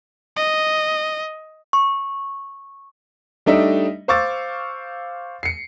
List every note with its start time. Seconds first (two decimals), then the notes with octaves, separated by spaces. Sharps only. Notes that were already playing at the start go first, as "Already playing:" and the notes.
0.37 D#5
1.73 C#6
3.46 G3 A3 D4 D#4 D#5 E5
4.08 C5 F5 C#6 D6 E6 A6
5.43 C7 C#7